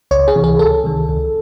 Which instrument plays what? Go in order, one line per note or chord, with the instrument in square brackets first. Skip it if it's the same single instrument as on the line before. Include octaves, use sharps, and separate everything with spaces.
[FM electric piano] C#2 C#5
G#4
C3 E3
G#4
C#2 A4
C3 D#3
C#2